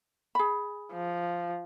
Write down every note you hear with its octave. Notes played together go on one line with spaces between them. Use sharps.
G#4 B5
F3